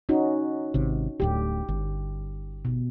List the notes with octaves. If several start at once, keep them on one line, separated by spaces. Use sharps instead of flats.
C#4 D#4 F#4
G#1 C3
D1 D2 A2 G4
G1
B2